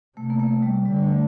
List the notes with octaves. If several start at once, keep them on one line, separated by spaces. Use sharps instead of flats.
C3 A3
A#3
A3
G3
D3 G3
A3